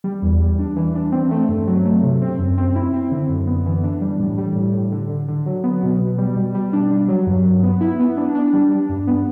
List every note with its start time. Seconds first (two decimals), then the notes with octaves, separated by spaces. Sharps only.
0.04 G3
0.22 E2
0.40 G3
0.59 D4
0.76 E3
0.95 D4
1.12 C4
1.31 A3
1.49 G2
1.67 F#3
1.85 A3
2.03 C3
2.22 C4
2.39 F#2
2.58 C4
2.76 E4
2.93 C4
3.11 D3
3.29 F#2
3.47 B3
3.66 E3
3.84 D4
4.01 G3
4.19 A2
4.38 G3
4.56 A2
4.73 A2
4.92 D3
5.09 D3
5.28 D3
5.46 F#3
5.64 B3
5.83 B2
6.00 B2
6.18 G3
6.36 B2
6.55 G3
6.73 D4
6.91 G3
7.08 F#3
7.27 G2
7.45 F#3
7.63 B3
7.81 E4
8.00 B3
8.17 D4
8.35 D4
8.53 G3
8.72 D4
8.89 G2
9.07 B3